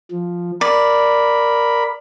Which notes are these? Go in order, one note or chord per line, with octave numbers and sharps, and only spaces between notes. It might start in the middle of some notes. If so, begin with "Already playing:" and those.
F3
A#4 D5 B5